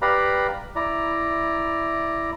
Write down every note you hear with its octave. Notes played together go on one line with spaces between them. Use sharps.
G4 B4 D5 F5 A#5 B5
E4 D5 A#5